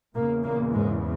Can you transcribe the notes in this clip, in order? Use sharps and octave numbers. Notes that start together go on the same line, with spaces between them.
E2 A#2 C#3 A#3
A#2 A#3
G#2 G#3